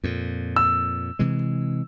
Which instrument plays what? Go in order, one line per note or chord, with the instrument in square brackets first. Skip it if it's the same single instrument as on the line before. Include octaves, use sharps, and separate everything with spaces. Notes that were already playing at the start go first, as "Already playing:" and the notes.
[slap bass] F2 A#2
[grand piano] E6
[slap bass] C3 E3 G#3